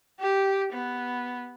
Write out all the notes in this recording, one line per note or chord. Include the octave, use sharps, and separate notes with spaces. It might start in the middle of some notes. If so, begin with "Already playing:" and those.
G4
B3